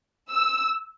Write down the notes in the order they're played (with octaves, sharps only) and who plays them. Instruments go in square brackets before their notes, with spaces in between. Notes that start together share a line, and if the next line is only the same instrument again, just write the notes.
[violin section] E6